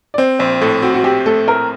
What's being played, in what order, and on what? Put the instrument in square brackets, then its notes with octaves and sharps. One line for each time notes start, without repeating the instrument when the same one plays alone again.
[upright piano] D5
[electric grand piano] C4 [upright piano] C5
[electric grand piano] A#1 [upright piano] C5
[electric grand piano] A2 [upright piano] A4
[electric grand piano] C4 [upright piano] F#4
[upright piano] F#4
[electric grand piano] C4 [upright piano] G4
[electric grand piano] A3 [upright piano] A4
[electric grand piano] A2 [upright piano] A#4